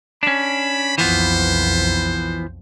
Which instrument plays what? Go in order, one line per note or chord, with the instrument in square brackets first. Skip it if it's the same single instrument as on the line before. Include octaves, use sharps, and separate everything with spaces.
[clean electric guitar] C#4 D4 [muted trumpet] B5
[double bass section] B1 F2 [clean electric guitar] E3 F3 B3 [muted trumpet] C5